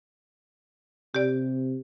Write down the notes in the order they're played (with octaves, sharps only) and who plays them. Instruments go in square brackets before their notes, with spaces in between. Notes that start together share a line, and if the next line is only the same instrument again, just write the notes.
[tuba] C3 [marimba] G4 D5